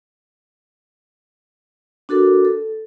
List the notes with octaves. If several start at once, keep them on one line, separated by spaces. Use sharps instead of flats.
D4 F#4 A4 A#4
A4